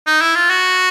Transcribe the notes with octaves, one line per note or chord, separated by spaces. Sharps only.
D#4
E4
F4
F#4